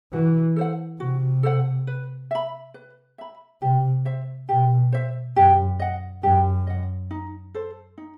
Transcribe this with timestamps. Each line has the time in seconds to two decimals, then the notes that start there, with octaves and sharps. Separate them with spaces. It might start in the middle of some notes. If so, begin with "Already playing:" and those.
0.13 E3 F#4
0.56 A4 C5 F#5
1.00 C3 F#4
1.43 A4 C5 F#5
1.87 B4
2.31 E5 B5
2.74 B4
3.18 E5 B5
3.62 C3 G4
4.05 C5 E5
4.49 B2 G4
4.92 C5 E5
5.36 F#2 G4
5.80 D#5 F#5
6.23 F#2 G4
6.67 D#5 F#5
7.11 D#4
7.54 A4 C5
7.98 D#4